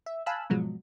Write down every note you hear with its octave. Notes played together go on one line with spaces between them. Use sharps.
E5
F5 G#5 A5 B5 E6 F#6
G#2 B2 F3 F#3 G#3